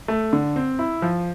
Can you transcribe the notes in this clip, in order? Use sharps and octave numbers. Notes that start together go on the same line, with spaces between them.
A3
D3
C4
E4
F3